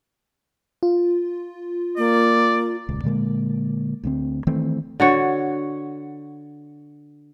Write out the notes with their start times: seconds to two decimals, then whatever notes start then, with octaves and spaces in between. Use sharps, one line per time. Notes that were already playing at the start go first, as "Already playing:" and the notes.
0.83 F4
1.98 A#3 D5
2.89 D#1 C#2
3.04 A#2 D3 G#3 A#3
4.04 D2 D3 C4
4.47 D#3 E3 A3 C4
5.00 D3 F#4 C#5